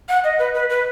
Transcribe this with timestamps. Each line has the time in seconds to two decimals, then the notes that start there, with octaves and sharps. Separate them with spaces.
0.09 F#5
0.24 D#5
0.39 B4
0.54 B4
0.70 B4